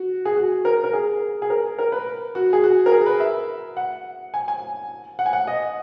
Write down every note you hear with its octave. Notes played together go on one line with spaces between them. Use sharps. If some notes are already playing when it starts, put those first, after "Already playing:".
Already playing: F#4
G#4
F#4
A#4
A#4
G#4
G#4
A#4
A#4
B4
F#4
G#4
F#4
A#4
G#4
B4
E5
F#5
G#5
G#5
F#5
G#5
F#5
D#5